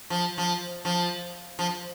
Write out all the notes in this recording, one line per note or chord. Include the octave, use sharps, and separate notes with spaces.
F3
F3
F3
F3